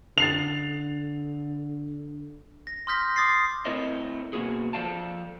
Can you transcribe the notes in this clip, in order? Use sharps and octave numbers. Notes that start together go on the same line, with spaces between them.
D3 A6 C7 F7
A#6
C6 D#6 F6 G6 A#6 B6
C6 D6 D#6 A6 A#6 C7
A3 C4 E4 A#4 C#5 D#5
B2 F#3 A#3 F#4 G#4
F3 A4 D5 F5 G5 A5